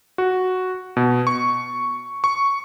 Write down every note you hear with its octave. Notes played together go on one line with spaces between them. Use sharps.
F#4
B2
C#6
C#6